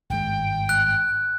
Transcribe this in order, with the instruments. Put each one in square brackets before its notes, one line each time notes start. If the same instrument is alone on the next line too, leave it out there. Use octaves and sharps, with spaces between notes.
[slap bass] G#1 G2 G#3 [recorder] G5
[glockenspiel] F#6